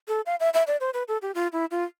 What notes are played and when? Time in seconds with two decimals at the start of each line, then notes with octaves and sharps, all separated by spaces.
0.08 A4
0.26 F5
0.40 E5
0.54 E5
0.67 D5
0.81 C5
0.94 B4
1.08 A4
1.22 G4
1.35 F4
1.53 E4
1.71 F4